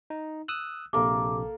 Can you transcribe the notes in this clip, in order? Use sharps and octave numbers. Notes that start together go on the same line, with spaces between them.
D#4
D#6 E6 F#6
A#1 C3 A#3 A4 D6